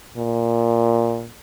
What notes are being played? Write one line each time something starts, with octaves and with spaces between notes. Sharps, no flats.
A#2